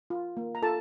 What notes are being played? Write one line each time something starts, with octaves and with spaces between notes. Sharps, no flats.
F4
A#3
A#5
F4 A4 A5